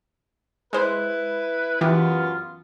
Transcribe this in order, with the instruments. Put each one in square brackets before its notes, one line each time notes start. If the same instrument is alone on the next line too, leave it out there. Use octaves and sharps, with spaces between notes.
[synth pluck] G#3 C5 [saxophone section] E4 B4
[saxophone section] F#2 B3 F4 [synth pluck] E3 E4 G4